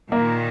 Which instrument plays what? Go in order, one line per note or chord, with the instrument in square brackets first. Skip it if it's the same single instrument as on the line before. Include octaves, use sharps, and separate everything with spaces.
[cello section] A#2 D#3 [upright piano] A#3